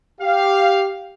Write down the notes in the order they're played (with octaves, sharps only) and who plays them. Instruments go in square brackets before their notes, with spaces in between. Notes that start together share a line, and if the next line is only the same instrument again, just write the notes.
[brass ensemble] G4 F5